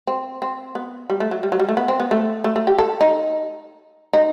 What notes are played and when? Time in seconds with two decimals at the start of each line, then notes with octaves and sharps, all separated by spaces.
0.07 C4
0.42 C4
0.75 B3
1.10 G3
1.20 A3
1.31 F#3
1.43 G3
1.52 F#3
1.59 G3
1.69 A3
1.77 B3
1.88 C4
2.00 B3
2.11 A3
2.44 A3
2.56 A3
2.67 G4
2.78 A4
3.01 D#4
4.13 D#4